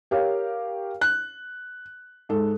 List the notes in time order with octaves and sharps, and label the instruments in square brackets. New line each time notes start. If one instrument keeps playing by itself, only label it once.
[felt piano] G4 A#4 C#5 F5
F#6
G#2 A4